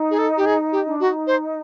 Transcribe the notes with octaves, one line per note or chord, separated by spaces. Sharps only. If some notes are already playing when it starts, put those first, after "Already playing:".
Already playing: D#4
G#4
A4
G4
G#4
G4
D4
D#4 F#4
C5